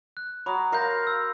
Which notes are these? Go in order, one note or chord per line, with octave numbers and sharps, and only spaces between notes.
F#6
F#3 B5 D#6
A#4 F5 C6 G6 A#6
E6